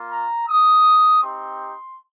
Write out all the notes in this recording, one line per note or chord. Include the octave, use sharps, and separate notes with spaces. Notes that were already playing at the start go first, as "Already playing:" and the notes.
Already playing: A#3 F4
A#5
D#6
C4 D#4 G4 C6